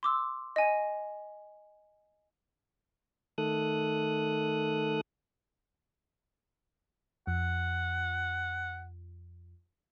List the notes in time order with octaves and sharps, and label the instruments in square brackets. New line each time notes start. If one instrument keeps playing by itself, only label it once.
[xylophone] C6 D6 E6
D#5 G#5
[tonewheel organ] D#3 A3 A4 D#6 F#6
[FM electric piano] F2 [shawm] F#5